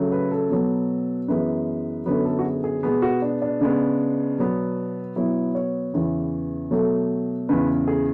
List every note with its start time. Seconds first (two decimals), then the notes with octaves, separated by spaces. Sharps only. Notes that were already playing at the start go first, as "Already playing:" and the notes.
Already playing: C#3 F#3 A3
0.12 B4
0.31 A4
0.50 B2 F#3 B3
1.28 F#2 E3 G#3 B3 B4
2.06 F#2 D3 F#3 B3 B4
2.25 A4
2.39 F#4
2.44 G#4
2.64 G#4
2.83 B2 G#3 B3 G#4
3.02 F#4
3.22 D4
3.42 D4
3.61 C#3 G#3 B3
4.38 B2 F#3 B3
5.16 B2 F#3 B3 E4
5.55 C#5
5.93 E2 C#3 E3 B3
6.71 B2 F#3 A3
7.49 E2 C#3 G#3 B4
7.88 G#4